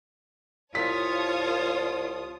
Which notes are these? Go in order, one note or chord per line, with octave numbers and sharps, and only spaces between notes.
C2 F4 C#5 A5 D#6 B6